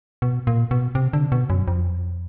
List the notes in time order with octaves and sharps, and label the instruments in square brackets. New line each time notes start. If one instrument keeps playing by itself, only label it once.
[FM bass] B2
A#2
B2
C3
D3
B2
F#2
F2